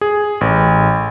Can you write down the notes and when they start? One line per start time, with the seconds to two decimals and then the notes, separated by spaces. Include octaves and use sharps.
0.01 G#4
0.41 A1